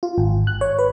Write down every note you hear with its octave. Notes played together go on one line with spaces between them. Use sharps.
F4
G#1
F#6
C#5
B4